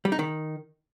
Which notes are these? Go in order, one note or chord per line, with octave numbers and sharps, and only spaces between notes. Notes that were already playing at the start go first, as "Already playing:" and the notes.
G3
D#4
D#3